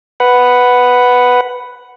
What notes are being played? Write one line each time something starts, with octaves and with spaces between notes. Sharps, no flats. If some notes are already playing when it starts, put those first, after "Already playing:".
B4 F#5